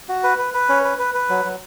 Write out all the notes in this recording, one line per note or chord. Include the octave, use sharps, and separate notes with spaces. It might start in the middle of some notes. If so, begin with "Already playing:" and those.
F#4
B4
B4
B4
C#4
B4
B4
B4
F#3
F#3